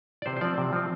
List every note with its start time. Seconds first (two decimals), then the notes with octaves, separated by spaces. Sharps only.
0.22 D5
0.26 C3 C5
0.37 C5
0.41 F3 C4 D5
0.58 C3
0.73 F3 C4